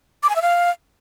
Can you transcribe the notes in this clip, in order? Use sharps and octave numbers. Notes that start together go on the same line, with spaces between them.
D6
G#5
E5
F5